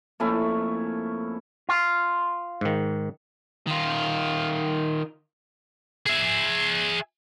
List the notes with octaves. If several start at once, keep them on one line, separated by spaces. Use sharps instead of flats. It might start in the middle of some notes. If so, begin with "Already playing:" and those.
F2 A3 A#3 C#4 E4
F4
G#2 D#3
D#3 F4
G#4 E5